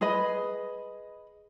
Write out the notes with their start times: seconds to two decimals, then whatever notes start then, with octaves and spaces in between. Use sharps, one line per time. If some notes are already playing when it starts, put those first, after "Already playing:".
0.01 G#4 B4 D#5 B5